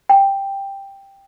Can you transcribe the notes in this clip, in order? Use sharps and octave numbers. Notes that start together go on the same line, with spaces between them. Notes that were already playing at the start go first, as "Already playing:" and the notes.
G5